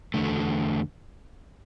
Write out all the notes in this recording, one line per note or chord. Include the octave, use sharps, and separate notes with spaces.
E2 D3 A3